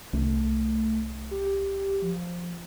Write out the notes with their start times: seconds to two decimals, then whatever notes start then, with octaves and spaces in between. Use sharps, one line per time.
0.13 C2 A3
1.31 G4
2.02 F3